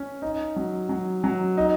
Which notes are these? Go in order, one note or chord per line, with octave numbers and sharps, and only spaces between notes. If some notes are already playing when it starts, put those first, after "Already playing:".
Already playing: C#4
D#4
F#3
F#3
F#3
D#4